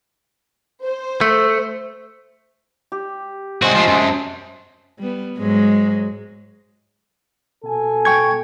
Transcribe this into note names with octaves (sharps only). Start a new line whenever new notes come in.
C5
A3
G4
C2 G#3 C4 F#4
F3 A3
F#2 A5
G3 B3
G#2 F#3 G#3
B2 A4 G#5
G5 C#6 G#6